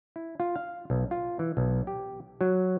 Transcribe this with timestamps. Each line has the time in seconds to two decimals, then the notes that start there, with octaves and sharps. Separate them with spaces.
0.16 E4
0.40 F4
0.56 F5
0.90 B1
1.11 F4
1.39 E3
1.57 B1
1.87 G4
2.41 F#3